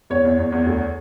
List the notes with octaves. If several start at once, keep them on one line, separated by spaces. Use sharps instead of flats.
E2 C#5
E2
E2
E2
D2